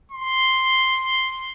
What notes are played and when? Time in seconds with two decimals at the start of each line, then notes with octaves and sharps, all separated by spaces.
0.12 C6